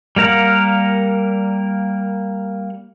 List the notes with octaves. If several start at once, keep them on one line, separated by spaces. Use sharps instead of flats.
G3 A#3 A#4 F5 F#5